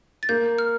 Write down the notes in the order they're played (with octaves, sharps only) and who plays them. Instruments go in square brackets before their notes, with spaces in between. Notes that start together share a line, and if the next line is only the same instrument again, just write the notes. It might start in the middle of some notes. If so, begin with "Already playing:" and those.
[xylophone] A6
[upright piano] A#3 [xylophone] G6
[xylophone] F6